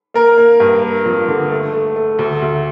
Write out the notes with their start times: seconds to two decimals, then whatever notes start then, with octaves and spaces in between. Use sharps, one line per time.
0.14 A#3 A#4
0.38 A#3
0.60 G2
0.83 A#3
1.06 F2
1.28 D3
1.51 A3
1.73 A3
1.96 A3
2.19 D2
2.42 D2